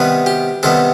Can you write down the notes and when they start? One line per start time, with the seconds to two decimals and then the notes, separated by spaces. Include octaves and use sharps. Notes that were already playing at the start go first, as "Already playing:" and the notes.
Already playing: C3 D#3 G3 B3 B4
0.26 G4
0.63 C3 D#3 G3 B3 A4